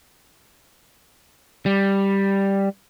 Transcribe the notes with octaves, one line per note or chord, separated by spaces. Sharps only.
G3